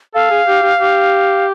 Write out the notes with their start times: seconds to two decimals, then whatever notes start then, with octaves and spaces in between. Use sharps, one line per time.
0.14 A4 F5
0.31 G#4
0.47 G4
0.62 G4
0.79 G4